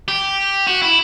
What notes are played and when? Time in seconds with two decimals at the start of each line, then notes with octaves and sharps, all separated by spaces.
0.08 G4
0.67 F#4
0.82 E4